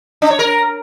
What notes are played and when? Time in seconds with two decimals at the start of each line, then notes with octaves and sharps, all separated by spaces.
0.22 D4
0.30 C#5
0.39 A#4